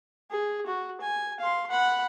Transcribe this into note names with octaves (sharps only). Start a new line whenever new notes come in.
G#4
F#4
G#5
F5 C6
F#5 B5